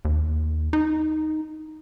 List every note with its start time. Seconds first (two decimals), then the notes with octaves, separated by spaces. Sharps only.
0.05 D#2
0.73 D#4